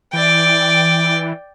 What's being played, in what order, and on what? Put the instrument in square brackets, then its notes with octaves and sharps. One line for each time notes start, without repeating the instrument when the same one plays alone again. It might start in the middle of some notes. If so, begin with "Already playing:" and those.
[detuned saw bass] E3 [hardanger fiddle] D5 G5